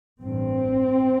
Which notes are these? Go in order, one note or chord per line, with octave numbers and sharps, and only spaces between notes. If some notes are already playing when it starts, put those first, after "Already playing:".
A1 G2 C4